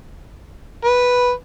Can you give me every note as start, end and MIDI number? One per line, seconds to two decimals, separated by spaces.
0.84 1.31 71